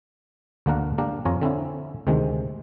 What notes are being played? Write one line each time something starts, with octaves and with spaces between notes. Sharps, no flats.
D2 D3 A#3 D4 A#4 F#5
A#3 D4 G4 A#4
F2 F4 C#5 G#5 A#5
D3 C4 C#4 E4
D2 C3 D#3 G#3